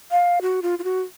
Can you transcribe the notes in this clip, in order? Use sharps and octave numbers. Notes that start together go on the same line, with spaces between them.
F5
F#4
F4
F4
F#4